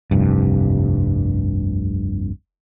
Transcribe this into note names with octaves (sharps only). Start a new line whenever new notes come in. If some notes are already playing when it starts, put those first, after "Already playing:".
F1 C2 G2